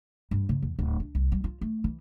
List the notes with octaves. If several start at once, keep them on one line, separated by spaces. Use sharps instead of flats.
G2
C#3
E2
D1
D4
C2
G3
F4
A3
E3